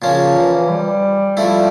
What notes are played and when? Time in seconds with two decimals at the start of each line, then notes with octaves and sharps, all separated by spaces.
0.02 A#2 C#3 F3 C#4
0.36 E3
0.69 G3
1.36 F3 G3 A3 E4